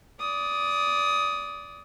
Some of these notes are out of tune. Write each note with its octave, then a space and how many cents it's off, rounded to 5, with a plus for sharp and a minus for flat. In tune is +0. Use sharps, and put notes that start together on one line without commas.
D5 -15 D#6 +10